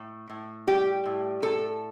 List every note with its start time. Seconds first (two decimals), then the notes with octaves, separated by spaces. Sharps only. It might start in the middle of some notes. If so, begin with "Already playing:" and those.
Already playing: A2
0.30 A2
0.67 G3 G4
1.06 A2
1.42 A2 A4